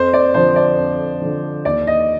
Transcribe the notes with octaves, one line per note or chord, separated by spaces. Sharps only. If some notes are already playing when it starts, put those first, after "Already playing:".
Already playing: F2 C5
D5
D3 F3 C5
D5
F2
D3 F3
D#2 D5
D#5